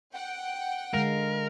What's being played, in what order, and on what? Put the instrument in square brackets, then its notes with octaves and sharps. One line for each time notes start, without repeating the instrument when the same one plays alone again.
[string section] F#5 G5
[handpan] D3 G#3 F5 [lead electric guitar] A#4